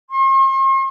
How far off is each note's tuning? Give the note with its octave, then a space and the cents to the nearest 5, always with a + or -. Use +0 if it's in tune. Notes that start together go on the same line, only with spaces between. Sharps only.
C6 +45